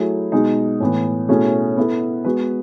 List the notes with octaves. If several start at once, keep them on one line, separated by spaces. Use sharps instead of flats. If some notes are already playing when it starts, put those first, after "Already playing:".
Already playing: F#3 A3 E4 G#4
B2 G#3 D#4
A2 E3 B3
B2 A3 C#4 E4 G#4
B3 E4 A4
G#3 B3 F#4 B4